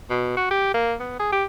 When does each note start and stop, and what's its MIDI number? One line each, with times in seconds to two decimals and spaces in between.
0.10 0.33 47
0.37 0.50 66
0.51 0.72 67
0.74 0.94 58
1.00 1.15 59
1.19 1.29 68
1.32 1.45 67